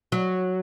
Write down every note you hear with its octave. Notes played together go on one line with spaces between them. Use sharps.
F#3